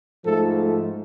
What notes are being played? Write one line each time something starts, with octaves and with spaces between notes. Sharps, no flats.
G#2 F3 A3 A4